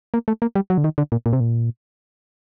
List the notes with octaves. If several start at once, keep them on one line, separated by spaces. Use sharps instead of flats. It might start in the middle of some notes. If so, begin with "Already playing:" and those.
A#3
A3
A#3
G3
F#3
D3
D#3
D3
A#2
A#2
C3
A#2